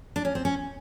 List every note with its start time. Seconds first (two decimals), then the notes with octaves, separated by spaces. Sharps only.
0.16 D4
0.25 C#4
0.35 C4
0.45 C#4